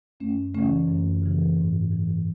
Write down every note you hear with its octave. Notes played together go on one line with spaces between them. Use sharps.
F#2 A3 C#4
C#3 E3 A3 C#4
F#2
C#3 E3
G#2
E3